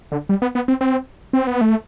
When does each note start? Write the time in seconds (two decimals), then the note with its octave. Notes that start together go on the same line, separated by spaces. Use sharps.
0.12 D3
0.29 G3
0.42 B3
0.55 B3
0.68 C4
0.81 C4
1.33 C4
1.47 B3
1.61 A3